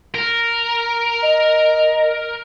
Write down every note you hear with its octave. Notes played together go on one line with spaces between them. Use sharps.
A#4
D#5